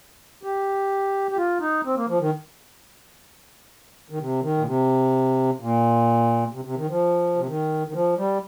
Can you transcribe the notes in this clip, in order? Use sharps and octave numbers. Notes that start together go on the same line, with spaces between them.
G4
G4
F4
D#4
C4
A#3
F3
D#3
D#3
C3
D#3
A#2
C3
A#2
C3
C3
D#3
F3
C3
D#3
D#3
F3
G3